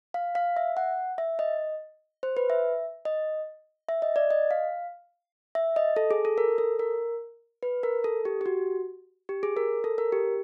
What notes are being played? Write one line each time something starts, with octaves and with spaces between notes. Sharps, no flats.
F5
F5
E5
F#5
E5
D#5
C5
B4
E5
D#5
E5
D#5
D5
D#5
F5
E5
D#5
A4
G#4
A4
A#4
A4
A#4
B4
A#4
A4
G4
G4
F#4
G4
G#4
A#4
A4
A#4
G4